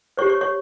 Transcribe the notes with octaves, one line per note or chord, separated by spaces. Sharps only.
G4 C5 C#5 C#6
C#5 C#6
C#5 C#6